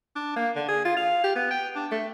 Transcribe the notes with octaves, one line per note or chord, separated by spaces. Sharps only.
D4
A#3
D3
G#4
F4
F5
G4
B3
G5
D4
A3